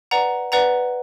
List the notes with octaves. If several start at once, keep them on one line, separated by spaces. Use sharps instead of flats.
B4 D5 F#5 A#5
B4 D5 F#5 A#5